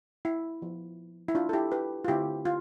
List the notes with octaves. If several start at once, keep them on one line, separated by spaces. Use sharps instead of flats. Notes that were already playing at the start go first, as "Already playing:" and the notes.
E4
F3 B3
E4
D4 F4
A4
E4 G4
G4 B4
F4
D3 A3 C4 E4 G4
F4